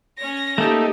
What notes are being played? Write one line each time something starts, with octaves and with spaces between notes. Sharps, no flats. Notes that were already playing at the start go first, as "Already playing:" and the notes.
C#4 C#5 A#6
A3 A#3 D#4 G4 A4